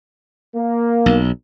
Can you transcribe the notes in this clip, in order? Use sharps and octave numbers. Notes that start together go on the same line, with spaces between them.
A#3
B1